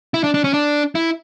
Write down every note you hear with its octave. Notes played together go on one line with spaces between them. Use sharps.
E4
D4
D4
C#4
D4
E4